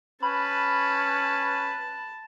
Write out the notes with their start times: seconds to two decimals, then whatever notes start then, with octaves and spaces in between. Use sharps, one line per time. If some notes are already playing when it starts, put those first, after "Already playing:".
0.23 C#4 B4 A5 B5